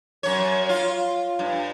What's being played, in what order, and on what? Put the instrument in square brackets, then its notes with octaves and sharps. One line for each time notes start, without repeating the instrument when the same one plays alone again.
[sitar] F#2 C#5
F4
G2